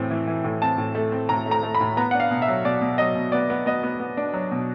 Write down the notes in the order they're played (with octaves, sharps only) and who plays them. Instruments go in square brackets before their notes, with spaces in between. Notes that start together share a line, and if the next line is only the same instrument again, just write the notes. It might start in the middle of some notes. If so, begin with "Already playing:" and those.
Already playing: [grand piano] A2 E3 A3 C4
E3
E3
A2
C4 A5
A2
A3
C4
A2 A#5
A3
A#5
A3
B5
A2
B3 A#5
D4 F#5
F5
B2
E5
F#3
B2 D5
B2
F#3 D#5
B2
B3 D5
B3
B3 D#5
B3
B3
D4
F#3
B2